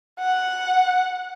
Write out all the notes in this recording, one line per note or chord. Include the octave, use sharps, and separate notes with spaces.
F#5